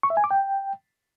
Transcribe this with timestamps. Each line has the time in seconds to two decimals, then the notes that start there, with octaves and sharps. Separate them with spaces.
0.03 C#6
0.10 E5
0.17 G#5
0.24 D6
0.31 G5